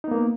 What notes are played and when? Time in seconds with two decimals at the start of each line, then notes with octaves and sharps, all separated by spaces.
0.04 D#4
0.08 B3
0.11 A#3